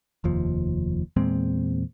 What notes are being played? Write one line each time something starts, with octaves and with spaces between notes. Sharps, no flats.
F1 D#2 F3
E2 A#2 G#3 C4